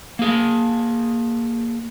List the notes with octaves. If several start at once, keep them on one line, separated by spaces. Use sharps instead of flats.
A#3 G#4